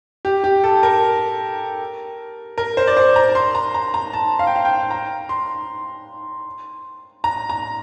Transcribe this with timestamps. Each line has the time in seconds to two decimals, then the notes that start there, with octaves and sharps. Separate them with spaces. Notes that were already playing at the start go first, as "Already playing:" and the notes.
0.25 G4
0.44 G4
0.64 A4
0.83 A#4
2.58 A#4
2.77 C5
2.87 D5
2.97 C5
3.16 A#5
3.35 C6
3.55 A#5
3.74 A#5
3.94 A#5
4.13 A5
4.39 F5
4.47 G5
4.56 F5
4.65 G5
4.91 A#5
5.29 C6
7.24 A#5
7.49 A#5